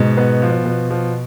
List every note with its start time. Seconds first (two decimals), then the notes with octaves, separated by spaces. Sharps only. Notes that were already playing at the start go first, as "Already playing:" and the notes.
Already playing: G#2 B2
0.17 B3
0.42 F3
0.66 B2 B3
0.91 F3